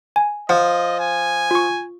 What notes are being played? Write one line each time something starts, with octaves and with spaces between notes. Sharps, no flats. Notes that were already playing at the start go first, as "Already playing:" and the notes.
G#5
F3 D#5 F#5
G#5
F4 C#6